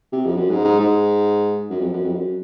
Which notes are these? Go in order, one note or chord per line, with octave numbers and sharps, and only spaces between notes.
C3
F2
F#2
G#2
G#2
G#2
F#2
F2
F#2
F2
F#2